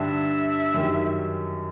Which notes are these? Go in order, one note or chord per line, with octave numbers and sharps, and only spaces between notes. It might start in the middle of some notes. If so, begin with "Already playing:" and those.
Already playing: G2 D3 G3 E5
F#2 D#3 G3